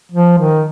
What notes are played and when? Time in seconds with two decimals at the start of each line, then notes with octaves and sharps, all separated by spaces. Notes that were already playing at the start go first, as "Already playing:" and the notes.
0.12 F3
0.38 D#3